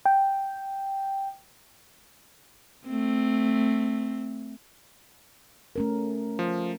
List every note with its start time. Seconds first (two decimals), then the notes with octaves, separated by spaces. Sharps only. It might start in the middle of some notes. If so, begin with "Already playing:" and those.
0.06 G5
2.87 A3 C4
5.76 A3 C#4 A#4
6.39 F3